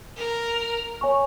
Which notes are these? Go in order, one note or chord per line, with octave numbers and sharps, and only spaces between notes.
A#4
C#5 G#5 C#6